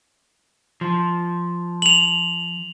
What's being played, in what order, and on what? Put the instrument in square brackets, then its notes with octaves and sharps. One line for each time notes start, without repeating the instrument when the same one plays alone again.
[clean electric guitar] F3
[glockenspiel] F7 F#7